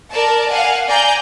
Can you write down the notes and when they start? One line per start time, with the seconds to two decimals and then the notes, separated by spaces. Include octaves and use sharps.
0.11 A#4 D5 A5
0.49 F5 F#5 G#5
0.88 D5 G#5 A#5 G6